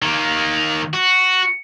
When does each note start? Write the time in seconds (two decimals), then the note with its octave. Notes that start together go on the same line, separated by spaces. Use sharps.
0.02 D#3 A#3
0.94 F#4